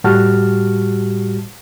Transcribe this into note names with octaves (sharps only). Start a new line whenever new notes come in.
A2 G3 F#4 G4 A5 F6